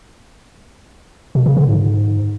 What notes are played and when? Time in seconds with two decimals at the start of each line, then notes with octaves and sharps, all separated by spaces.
1.35 B2
1.46 C#3
1.57 D3
1.67 G#2